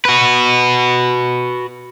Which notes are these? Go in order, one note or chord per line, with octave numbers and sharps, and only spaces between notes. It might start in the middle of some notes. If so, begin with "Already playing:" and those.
F#4 B4